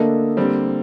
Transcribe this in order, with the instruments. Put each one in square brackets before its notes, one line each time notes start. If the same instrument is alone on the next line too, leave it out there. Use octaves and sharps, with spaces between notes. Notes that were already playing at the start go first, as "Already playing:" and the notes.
Already playing: [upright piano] D3 A3 D4 A4 D#5 [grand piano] A#3
[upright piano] D3 G3 C4